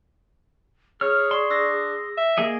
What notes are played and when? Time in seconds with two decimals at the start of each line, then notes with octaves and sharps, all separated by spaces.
1.01 G#4 C#5 F6
1.31 D5 C6 C#6
1.50 D4 E6 A#6
2.17 E5
2.38 A#3 G#4 D#5